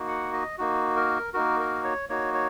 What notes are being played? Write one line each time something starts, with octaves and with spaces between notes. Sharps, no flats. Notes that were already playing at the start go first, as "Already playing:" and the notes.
Already playing: A#3 D#4 F#4
F#5
D#5
A#3 D#4 F#4
A#4
A#3 D#4 F#4 A#4
A#4
C#5
A#3 D#4 F#4 C#5
C#5